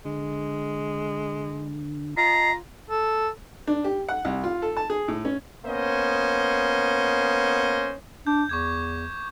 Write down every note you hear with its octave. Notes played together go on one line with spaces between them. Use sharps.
D3 G#3
F4 D#5 A5 A#5 C7
A4
D4
G4
F#5
C2
F4
A4
A5
G#4
A2
C#4
A#3 B3 C#4 C5 D#5
D4 G6
E2 C#6 D6 G#6